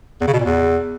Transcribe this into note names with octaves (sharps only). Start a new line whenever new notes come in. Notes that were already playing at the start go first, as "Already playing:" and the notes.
E2
C#3
B2
A#2
E2